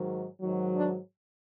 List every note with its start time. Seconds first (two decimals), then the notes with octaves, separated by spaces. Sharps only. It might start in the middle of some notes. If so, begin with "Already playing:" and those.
Already playing: G#2 D#3 F#3
0.41 G#2 D#3 F#3
0.76 D4